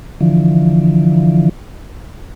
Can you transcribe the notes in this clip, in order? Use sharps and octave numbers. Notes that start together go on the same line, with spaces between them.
D3 E3 F3